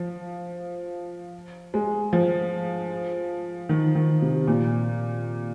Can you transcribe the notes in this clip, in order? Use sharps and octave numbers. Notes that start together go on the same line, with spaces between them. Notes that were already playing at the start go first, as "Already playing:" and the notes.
Already playing: F3
G#3
F3
D#3
D#3
C3
A#2